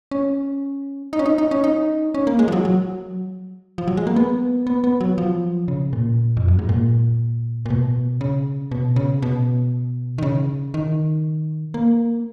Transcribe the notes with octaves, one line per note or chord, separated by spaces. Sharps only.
C#4
D#4
C#4
D#4
D#4
C#4
D#4
C#4
A#3
G#3
F3
F#3
F#3
F3
F#3
G#3
A#3
B3
B3
B3
F#3
F3
C#3
A#2
F2
F#2
G#2
A#2
A#2
B2
C#3
B2
C#3
B2
D#3
C#3
D#3
A#3